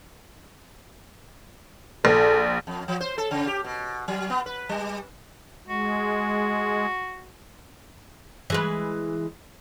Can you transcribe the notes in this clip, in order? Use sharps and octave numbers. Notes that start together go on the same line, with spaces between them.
A#1 A4
F2
F3
C5
A4
C#3
G4
B2
F#3
B3
B4
G3
G#3 F#4
E3 G#3 B4